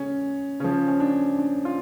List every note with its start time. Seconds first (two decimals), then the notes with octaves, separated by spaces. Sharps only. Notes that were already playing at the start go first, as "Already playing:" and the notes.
Already playing: C#3 C#4
0.60 C#3 F3 C#4
0.88 C#4
1.00 D4
1.39 D4
1.65 F4